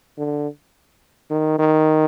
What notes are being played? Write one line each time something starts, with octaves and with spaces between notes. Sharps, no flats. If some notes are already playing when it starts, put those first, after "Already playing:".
D3
D#3
D#3